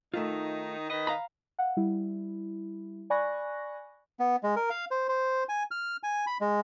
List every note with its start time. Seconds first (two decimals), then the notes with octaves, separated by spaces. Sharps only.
0.14 D#3 A3 D#4 F4
0.89 D#3 B4 D#5
1.07 F5 A#5 B5
1.59 F5 F#5
1.77 G3 E4
3.10 D5 G#5 B5 C#6 F#6 A#6
4.19 B3
4.43 G#3
4.56 A#4
4.70 F5
4.91 C5
5.09 C5
5.49 G#5
5.71 F6
6.03 G#5
6.27 B5
6.41 G#3